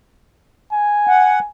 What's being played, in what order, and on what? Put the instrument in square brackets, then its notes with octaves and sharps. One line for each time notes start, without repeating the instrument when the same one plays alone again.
[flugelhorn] G#5
[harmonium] F#5